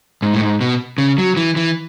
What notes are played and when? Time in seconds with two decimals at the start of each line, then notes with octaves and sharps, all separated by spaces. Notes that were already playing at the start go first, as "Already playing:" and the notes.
0.22 G#2
0.34 A2
0.41 G#2
0.61 B2
0.98 C#3
1.18 F#3
1.37 E3
1.56 E3